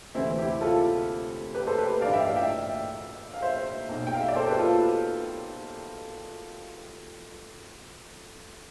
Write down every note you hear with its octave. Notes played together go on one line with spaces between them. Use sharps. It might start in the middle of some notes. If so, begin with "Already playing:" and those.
D2 C3 E3 C4 E4
E4 G4
F4 A4
G4 B4
A4 C5
G4 B4
A1 G2 E3 D5 F5
E5 G5
D5 F5
E5 G5
F5
C5 E5
B1 B2
G5
F5
E5
D5
A4 C5
G4 B4
F4 A4